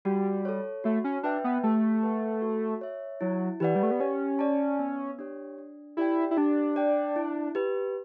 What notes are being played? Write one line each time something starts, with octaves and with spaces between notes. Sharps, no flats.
G3 F#4
A4 C#5
A3 F#4
C#4
D4 B4 E5 G5
B3
A3 G4
B4 F#5
F#4
C#5 E5
F#3 E4
E3 G4 B4 D5 F#5
G3
A3
B3
C#4 G4
D5 A5
B3
D4 G4 C#5
D4
E4 G4 D5 G5
E4
D4 G4
D5 G5
E4
G4 B4